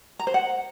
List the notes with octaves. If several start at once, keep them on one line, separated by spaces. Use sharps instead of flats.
A#5
C5
F#5